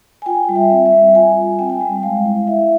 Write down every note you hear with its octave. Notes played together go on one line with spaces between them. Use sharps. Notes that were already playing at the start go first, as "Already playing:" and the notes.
G#5
F4 G5
G3
E5
C4
E5
G3
F4 G#5
G3
C4 G5
G#5
G3 G5
G#3 F5
E4
E4 E5